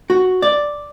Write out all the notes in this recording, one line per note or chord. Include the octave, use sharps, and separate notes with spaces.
F#4
D5